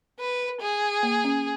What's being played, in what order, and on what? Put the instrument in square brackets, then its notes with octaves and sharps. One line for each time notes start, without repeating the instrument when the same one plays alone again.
[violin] B4
G#4
[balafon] A#3
C#4